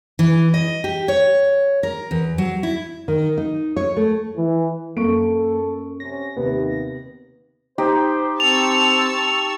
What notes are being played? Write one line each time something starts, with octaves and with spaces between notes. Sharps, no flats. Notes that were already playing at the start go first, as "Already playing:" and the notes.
E3
D#5
G4
C#5
A#4
E2
F#3
E4
D#3
D#4
C#5
A3
E3
F#2 A#3 A4 C#6 D7
C3 C#4 A#6
D#2 C3 B3
D#4 G4 C5
C4 A5 C#6 E6 F7